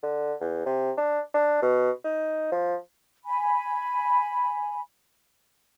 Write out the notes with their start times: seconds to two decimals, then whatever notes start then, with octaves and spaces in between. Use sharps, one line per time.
0.03 D3
0.41 E2
0.66 C3
0.98 D4
1.34 D4
1.62 B2
2.05 D#4
2.52 F3
3.25 G#5 B5